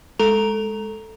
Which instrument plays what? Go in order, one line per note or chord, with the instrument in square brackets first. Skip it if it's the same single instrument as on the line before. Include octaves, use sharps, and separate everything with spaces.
[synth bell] G#3 A4 A#5 F7